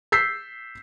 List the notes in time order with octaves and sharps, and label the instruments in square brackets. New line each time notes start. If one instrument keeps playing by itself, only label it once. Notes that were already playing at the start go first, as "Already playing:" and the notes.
[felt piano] E6 G6 B6 C7